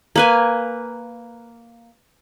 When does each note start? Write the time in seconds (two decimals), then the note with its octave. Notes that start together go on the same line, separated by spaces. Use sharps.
0.16 A#3 B4 G#5